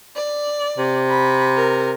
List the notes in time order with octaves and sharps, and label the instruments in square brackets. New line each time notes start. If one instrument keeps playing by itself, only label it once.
[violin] D5
[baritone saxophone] C3
[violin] B5
A#4